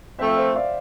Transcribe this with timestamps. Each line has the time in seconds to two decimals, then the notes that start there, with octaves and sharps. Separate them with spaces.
0.19 F3 A3 C4 C5 E5
0.37 C5 E5
0.55 D5 F5